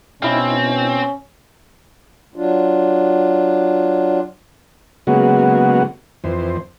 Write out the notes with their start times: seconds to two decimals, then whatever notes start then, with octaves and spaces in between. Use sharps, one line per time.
0.22 B2 C4 C#4 D#4 E4 F5
2.36 F#3 D4 F4
5.07 C#3 F#3 G#3 A#3 B3 F#4
6.24 F2 E3 C5